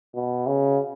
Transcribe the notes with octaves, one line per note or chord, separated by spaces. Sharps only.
B2
C#3